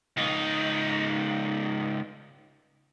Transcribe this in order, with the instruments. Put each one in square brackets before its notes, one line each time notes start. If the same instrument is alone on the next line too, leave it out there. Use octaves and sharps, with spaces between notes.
[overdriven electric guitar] C#2 D#4